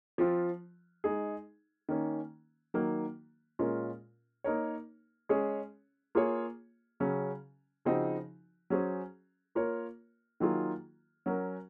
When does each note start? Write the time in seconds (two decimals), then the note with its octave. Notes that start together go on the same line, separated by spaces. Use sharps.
0.18 F3 C4 F4
1.04 G#3 D#4 G#4
1.89 D#3 A#3 C#4
2.74 D#3 F#3 A#3
3.59 A#2 G#3 C#4 F4 A#4
4.44 A#3 D#4 A#4 C#5
5.29 G#3 C#4 G#4 C#5
6.15 A#3 F4 G#4 C#5
7.00 C#3 F#3 C#4
7.85 C#3 F3 C4 D#4 F#4
8.70 F#3 C#4 G#4 C5
9.55 A#3 F4 A#4 C#5
10.40 D#3 F#3 A#3 F4 G#4
11.26 F#3 C#4 F#4 A#4